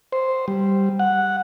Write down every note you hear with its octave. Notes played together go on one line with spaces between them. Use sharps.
C5
G3
F#5